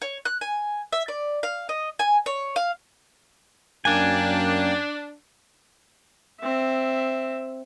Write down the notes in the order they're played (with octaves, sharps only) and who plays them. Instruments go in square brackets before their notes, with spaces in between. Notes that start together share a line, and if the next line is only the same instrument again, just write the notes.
[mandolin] C#5
F#6
G#5
E5
D5
F5
D#5
G#5
C#5
F5
[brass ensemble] F#2 [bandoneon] A#3 G5 [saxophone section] D4 [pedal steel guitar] G#5
[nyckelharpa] C4 E5